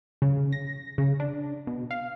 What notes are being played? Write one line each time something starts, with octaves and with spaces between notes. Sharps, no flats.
C#3
A#6
C#3
D4
B2
F5